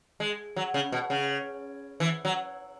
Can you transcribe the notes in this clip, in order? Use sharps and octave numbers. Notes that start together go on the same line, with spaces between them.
G#3
F#3
C#3
B2
C#3
E3
F#3